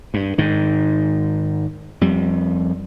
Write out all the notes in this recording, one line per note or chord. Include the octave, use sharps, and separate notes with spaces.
G2
G#2 D#3
F2 G3